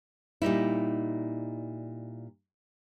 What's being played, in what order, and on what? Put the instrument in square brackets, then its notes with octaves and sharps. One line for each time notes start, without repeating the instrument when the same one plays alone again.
[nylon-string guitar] A#2 G3 D#4 E4